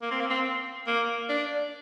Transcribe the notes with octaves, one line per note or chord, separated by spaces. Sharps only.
A#3
C4
A#3
C4
A#3
D4